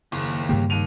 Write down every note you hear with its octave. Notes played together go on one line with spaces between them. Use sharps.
F#1 D#2
G2 C#3 A#3 G4
D#2 D#7 F7